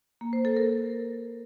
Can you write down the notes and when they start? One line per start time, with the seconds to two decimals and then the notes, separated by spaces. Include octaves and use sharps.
0.21 A#3
0.33 C5
0.45 A4
0.57 A#4